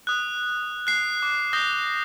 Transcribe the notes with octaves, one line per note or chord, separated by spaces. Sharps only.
D#6 F#6
F#6 C7
D6
D#6 G6 A#6 G7